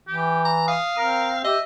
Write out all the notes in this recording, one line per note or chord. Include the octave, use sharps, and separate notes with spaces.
E3 G4
A#5
F5 D#6
C4 A#4
G4 D#5 E5